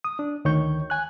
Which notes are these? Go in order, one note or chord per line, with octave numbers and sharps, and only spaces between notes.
D#6
D4
D2 D#3 C#5 C#6 G6
G#5 F#6